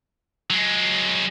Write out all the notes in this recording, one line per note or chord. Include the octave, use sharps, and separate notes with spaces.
F#3 G#3